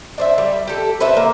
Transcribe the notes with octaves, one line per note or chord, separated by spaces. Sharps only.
D4 C5 E5
G3
G4 A4
B4 C5 D5 E5
A#3